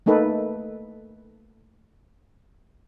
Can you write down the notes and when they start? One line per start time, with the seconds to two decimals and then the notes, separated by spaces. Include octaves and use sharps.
0.06 A3 A#3 D#4 A4 B4